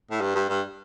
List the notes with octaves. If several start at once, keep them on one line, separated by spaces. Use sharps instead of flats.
A2
G2
G2
G2